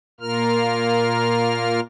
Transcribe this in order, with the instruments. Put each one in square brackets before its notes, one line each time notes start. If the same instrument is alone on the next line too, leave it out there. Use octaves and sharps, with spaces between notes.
[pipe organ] A#2 A#3 F4 A#4 F6